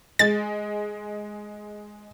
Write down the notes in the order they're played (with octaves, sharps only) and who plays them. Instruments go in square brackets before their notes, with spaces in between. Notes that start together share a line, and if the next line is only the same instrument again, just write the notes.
[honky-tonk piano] G#3 [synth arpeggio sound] A6